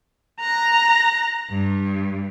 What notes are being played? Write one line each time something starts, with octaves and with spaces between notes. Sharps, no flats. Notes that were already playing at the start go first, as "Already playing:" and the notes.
A#5 F#6 A#6
G2